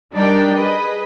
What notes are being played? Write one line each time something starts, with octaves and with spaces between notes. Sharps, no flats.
G3 D4 D#4 A#4 D5 G5
G#4 B4 D#5